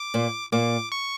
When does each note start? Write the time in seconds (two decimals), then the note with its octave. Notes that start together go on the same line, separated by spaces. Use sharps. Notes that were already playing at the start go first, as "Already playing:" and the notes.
Already playing: D6
0.14 A#2 A#3
0.52 A#2 A#3 D6
0.92 C#6